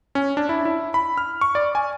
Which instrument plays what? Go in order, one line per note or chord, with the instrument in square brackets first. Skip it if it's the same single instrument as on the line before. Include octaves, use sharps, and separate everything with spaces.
[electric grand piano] C#4
D4
E4
E4
B5
F6
C#6
D5
G#5